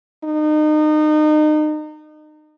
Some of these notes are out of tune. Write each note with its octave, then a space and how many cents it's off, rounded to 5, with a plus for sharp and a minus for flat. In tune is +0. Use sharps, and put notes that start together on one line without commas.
D#4 -30